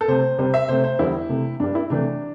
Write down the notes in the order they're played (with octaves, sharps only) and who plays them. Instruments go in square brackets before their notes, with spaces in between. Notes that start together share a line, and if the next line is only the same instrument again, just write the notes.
[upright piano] A4
C3 A3 C5
C3 G3 C5
E5
C3 A3 C5
C5
E2 D3 G3 E4
C3 A3
G2 G3 D4
E4
C3 E3 A3 D4